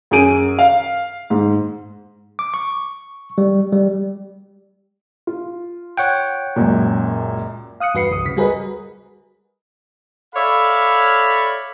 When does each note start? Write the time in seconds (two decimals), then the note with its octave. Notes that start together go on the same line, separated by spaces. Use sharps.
0.11 F#2 C#4 G#4 G#5 D7 D#7
0.59 F5
1.30 G#2
2.39 D6
2.54 C#6
3.38 G3
3.73 G3
5.27 F4
5.97 C#5 F#5 G5
6.56 C#2 F#2 A#2
7.80 F5 D#6 F#6 C#7
7.94 E2 G2 F#4 B4 C7 C#7
8.11 G1 C2 D#6
8.25 D2 C#3 B6
8.37 G3 F#4 G#4 A#4 B4 D#5
10.35 A4 C#5 D5 E5 F5 B5